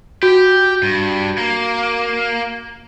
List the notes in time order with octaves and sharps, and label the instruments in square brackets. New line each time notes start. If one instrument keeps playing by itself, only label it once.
[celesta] F#4 [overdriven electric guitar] G4
[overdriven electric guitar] G2
A#3